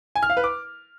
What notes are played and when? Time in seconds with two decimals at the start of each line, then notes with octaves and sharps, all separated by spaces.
0.16 G#5
0.23 F6
0.30 F5
0.37 B4
0.44 D6